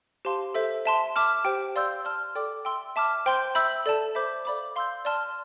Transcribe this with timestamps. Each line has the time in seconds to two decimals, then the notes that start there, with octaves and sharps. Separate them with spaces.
0.25 G4 C5 F5 A5 C6
0.54 A4 C5 E5
0.85 E5 A5 C6
1.16 E5 A5 D6 F6
1.45 G4 C5 G5
1.76 D5 F5 C6 E6 G6
2.05 D5 A5 C6 F6
2.35 A4 D5 G5 D6
2.65 E5 G5 C6 E6
2.96 E5 A5 D6 F6
3.26 C5 G5 C6 G6
3.55 E5 B5 E6 G6
3.86 A4 D5 A5
4.15 C5 E5 B5 D6 G6
4.45 A4 D5 F5 B5 D6
4.76 F5 C6 E6 G6
5.05 D5 A5 C6 F6